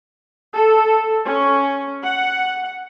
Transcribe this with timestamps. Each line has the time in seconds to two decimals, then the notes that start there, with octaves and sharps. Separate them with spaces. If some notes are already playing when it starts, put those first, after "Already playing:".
0.54 A4
1.26 C#4
2.04 F#5